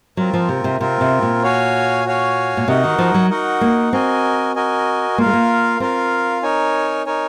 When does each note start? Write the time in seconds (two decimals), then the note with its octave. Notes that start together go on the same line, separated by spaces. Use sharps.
0.17 F#3 C4 F4 A#4
0.33 F3
0.49 C3
0.64 C3
0.80 C3 C4 F4 A#4
1.01 C3
1.22 A#2
1.43 F#4 C#5 F5 G#5
2.05 F#4 C#5 F5 G#5
2.57 A#2
2.68 C3 D#4 F#4 A#4 D#5 F#5
2.84 D#3
2.98 F3
3.14 F#3
3.30 D#4 F#4 A#4 D#5 F#5
3.61 A#3
3.93 C4 F#4 A#4 D#5 G#5
4.55 F#4 A#4 D#5 G#5
5.18 A#3 F4 A#4 F5
5.26 G#3
5.33 A#3
5.80 C4 F4 A#4 F5
6.43 D#4 A#4 C#5 G#5
7.06 D#4 A#4 C#5 G#5